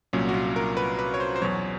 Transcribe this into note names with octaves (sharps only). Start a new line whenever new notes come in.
C2 A#2 F#3 C#4
F#4
F4
A#4
B4
B4
C#5
C5
C5
E2 B2 F#3 C#5